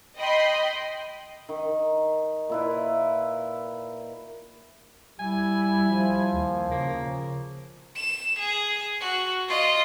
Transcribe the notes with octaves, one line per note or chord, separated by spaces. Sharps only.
D#5 G5 B5 C6
D#3
A#2 E4 B4
G3 E4 G#5
F3
D#2
C#3 A#3
E7
G#4
F#4
F4 D#5